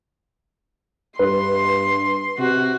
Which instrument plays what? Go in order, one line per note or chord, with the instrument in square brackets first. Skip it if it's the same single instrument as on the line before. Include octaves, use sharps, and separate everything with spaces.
[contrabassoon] G2 [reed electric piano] B4 [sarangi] C6
[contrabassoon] C3 [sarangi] F#4